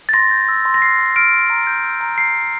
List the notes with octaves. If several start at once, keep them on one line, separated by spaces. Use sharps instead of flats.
A6
C6 A#6
G6
E6
C6
A#6
F6 C7
C6
F6 D7
C6
A#5
G6
E6
A#5
A#5 C7
G6